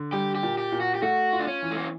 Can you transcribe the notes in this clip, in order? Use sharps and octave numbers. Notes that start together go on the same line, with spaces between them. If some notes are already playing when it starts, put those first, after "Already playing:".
Already playing: D3
G3 G4
G4
A#2
G4
A#2
F#4
G4
A3 F#4
F4
D4
C#4
E3
A3
A#3